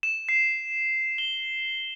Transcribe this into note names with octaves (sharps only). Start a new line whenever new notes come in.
E7
C7
G7